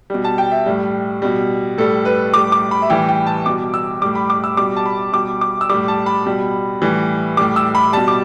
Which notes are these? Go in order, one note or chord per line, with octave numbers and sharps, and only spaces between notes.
B2 G3
A5
G5
E5
A2 G3
B2 G3
A2 G3 A4
B4
A2 G3 D6
D6
B5
E5
A2 E3 G3 G5
G5
A5
B2 G3 D6
E6
A2 G3 D6
B5
D6
E6
B2 G3 D6
A5
B5
B2 G3 D6
D6
E6
A2 G3 D6
A5
B5
B2 G3
A2 E3 G3
A2 G3 D6
E6
B5
B2 G3 A5
D6